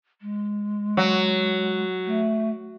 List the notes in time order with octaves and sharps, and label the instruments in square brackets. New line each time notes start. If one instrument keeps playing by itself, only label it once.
[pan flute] G#3
[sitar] F#3
[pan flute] A3